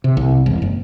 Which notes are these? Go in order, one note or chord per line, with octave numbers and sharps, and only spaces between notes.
C3
C2
E1
F#1